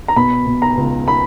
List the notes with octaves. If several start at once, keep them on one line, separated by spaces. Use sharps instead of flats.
A#5
B2 B5
B2
A#5
C#2
B5